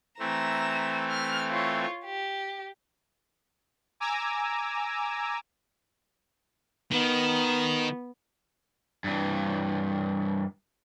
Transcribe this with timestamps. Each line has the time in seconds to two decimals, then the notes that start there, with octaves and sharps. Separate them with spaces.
0.19 E3 A3 C4 A#5 E7
1.11 F6
1.50 F4 C#5
2.05 G4
4.00 G#5 A#5 D6 E6
6.91 D#3 B3
9.04 G2 E3